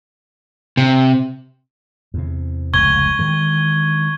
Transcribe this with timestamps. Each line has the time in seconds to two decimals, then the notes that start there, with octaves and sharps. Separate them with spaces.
0.77 C3
2.14 E2 C3
2.73 F1 C#2 C#6 G#6 G7
3.19 D#3 E3 G#3